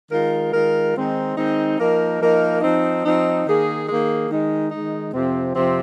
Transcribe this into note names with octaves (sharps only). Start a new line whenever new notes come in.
D#3 G#3 F4 A#4
D#3 G#3 F4 A#4
D#3 G#3 C4 D#4
D#3 G#3 C4 D#4
F3 A#3 D#4 A#4
F3 A#3 D#4 A#4
F3 C4 D#4
F3 C4 D#4
D#3 A#3 G#4
D#3 A#3 G#4
D#3 G#3 D#4
D#3 G#3 D#4
F2 C3 F3 C4
F2 C3 F3 C4